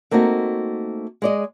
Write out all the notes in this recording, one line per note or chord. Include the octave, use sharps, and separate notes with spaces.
A3 A#3 C4 D#4 F#4
G#3 D5 D#5